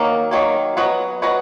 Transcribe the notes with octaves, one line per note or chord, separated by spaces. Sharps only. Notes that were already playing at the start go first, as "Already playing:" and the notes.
Already playing: D#3 F#3 A#3
D#3 F#3 A#3
F#3 B3 F#4 B4 D#5
F#3 B3 F#4 B4 D#5